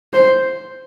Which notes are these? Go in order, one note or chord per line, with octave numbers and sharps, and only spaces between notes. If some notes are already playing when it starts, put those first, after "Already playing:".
C5